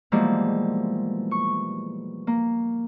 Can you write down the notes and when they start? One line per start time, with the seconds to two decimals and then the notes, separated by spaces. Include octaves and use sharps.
0.12 B2 E3 F3 G3 G#3 A#3
1.31 C#6
2.27 A#3